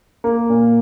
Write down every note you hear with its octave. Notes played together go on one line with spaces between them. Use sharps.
A#3
A#2